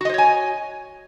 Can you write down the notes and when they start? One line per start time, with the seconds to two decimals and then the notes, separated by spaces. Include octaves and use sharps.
0.01 F#4
0.05 D#5
0.09 C5
0.14 C#5
0.18 G#5